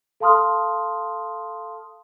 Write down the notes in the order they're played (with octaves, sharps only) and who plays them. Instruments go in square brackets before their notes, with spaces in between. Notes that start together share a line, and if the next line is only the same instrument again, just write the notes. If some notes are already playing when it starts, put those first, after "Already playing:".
[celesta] A4 F5 A5 C6 D#6 F6